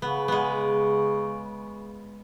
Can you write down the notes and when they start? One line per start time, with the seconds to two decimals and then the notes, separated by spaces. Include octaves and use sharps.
0.02 C#3 B3
0.28 G#3 B3